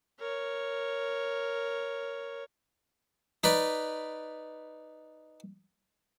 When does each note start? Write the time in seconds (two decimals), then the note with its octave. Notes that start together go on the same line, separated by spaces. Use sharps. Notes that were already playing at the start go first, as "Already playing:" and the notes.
0.20 A#4 C#5
3.44 D#4 B4 D5